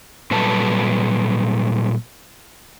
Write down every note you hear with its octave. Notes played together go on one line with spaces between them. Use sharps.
A#2 F#3 G3 A4 B4 A5